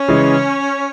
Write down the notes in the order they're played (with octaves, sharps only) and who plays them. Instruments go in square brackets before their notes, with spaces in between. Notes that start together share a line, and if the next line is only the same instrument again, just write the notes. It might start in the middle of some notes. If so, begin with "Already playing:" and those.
Already playing: [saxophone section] C#4
[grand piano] C#3 E3 G#3